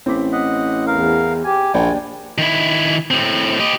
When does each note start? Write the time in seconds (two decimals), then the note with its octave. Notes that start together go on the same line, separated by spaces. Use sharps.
0.06 A1 C4 D6 B6
0.32 D#5 F#5
0.87 E2 A#4 F5
1.44 G4 G#5
1.74 A#1 D#2 D4 D5 G5
2.38 D#3 E4
3.11 A2 C4
3.60 G4 D#5